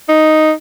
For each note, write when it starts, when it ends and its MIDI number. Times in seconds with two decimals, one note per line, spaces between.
0.09 0.52 63